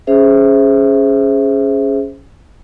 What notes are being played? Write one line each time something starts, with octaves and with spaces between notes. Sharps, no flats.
C#4 G#4 C5 E5